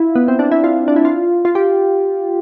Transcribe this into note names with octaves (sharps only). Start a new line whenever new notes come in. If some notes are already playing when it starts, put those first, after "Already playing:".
Already playing: E4 F4
B3
C4
D4
E4
F4
D4
E4
F4
F4
G4